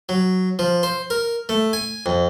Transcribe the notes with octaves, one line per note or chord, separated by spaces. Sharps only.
F#3
F3
C5
A#4
A3
G#5
F2